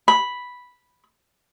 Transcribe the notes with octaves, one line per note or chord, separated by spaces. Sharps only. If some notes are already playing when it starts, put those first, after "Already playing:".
B5